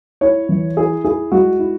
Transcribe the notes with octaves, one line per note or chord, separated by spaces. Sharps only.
E4 C#5
E3
E4 G#4
E4 G#4
G#3 F#4
E4